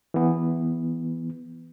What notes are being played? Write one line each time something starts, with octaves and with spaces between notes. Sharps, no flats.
E3 B3